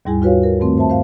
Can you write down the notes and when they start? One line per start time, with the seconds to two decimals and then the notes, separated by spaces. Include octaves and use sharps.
0.05 D#2 G#2 G3 E4 G#4 G#5
0.22 F4 F#4 B4 C#5 F5
0.43 A#4
0.60 G2 D#3 A3 C4
0.77 C5 E5 A5
0.90 C5 F5